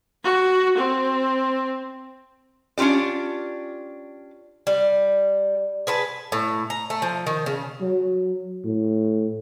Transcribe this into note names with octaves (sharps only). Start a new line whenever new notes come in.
F#4
C4
C#4 D4 F4 G4 D5
G3
G#4 B4 A5
A2
A#5
A3
F3
D#3
C#3
F#3
A2